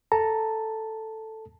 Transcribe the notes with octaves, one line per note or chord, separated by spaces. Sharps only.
A4 A5 A#5